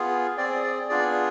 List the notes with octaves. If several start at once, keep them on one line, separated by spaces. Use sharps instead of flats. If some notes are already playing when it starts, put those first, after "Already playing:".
Already playing: B3 F4 G#4
C4 G#4 D5
D5
B3 D4 F4 G#4 D5